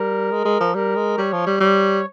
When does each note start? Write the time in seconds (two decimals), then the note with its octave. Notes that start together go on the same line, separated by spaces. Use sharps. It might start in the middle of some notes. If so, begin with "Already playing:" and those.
Already playing: G3 A#4
0.32 G#3
0.45 G#3
0.60 F3
0.75 G3 A#4
0.96 G#3
1.17 G3 C#5
1.33 F3
1.46 G3
1.60 G3 C#5